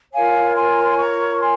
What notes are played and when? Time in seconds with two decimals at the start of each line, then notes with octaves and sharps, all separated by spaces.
0.13 F4 A#4 C#5 F5 G#5
0.56 G#5 C6
0.70 A#5
0.84 C6
0.98 A#5 C#6
1.35 A#5
1.40 G#5 C6